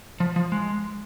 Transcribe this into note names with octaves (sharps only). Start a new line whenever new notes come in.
F3
F3
G#3